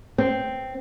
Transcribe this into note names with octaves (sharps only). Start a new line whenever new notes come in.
C4